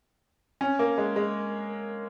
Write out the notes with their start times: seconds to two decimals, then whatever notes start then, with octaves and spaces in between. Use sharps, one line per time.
0.61 C#4
0.79 A#3
0.98 G#3
1.16 G#3